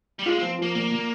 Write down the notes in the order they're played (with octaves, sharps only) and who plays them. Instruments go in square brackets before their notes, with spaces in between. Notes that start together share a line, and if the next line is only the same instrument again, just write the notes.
[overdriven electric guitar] G3
[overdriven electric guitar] G#3 [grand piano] F4
[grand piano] F3 [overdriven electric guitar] C4
[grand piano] F3 [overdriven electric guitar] A#3
[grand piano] A#2 [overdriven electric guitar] A#3
[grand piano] A#2